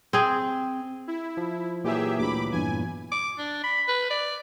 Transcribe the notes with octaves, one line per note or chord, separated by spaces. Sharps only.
C4 G#4
E4
F3
A#2 E3 F#3 G4 G#4 E5
D2 B5 D6
E2 G2 G#5
D6
D4
B5
B4
D5